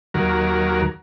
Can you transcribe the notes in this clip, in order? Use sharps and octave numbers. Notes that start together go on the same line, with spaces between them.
D#2 F#3 A#4